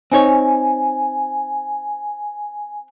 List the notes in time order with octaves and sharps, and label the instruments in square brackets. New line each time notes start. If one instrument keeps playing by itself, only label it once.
[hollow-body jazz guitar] C4 D#4 C#5 [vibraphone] G#5